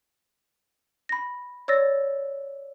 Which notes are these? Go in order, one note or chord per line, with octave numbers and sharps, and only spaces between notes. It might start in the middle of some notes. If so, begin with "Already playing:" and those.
B5 A#6
C#5 D5 E6 A6 A#6